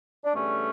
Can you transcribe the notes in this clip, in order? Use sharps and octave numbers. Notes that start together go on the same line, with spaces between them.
D4
E2 D3 G3 A3 C#4